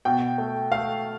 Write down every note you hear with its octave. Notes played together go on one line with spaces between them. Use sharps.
B2 G5
A3
A3 F5